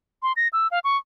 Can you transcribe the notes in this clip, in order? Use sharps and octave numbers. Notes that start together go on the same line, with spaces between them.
C6
A#6
E6
F5
C#6